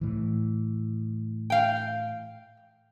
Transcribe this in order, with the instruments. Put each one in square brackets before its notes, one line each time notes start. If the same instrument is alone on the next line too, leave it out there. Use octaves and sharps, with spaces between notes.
[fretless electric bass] A2 E3
[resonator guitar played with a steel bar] F5 G5